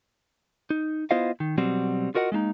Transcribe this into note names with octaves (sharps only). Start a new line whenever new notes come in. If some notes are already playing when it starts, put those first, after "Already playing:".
D#4
B3 E4 F4 C5 D#5 F5
D#3
B2 F#3 G3 C4 F#4
F4 F#4 A#4 D#5 F#5
G#3 A#3 D4 D#4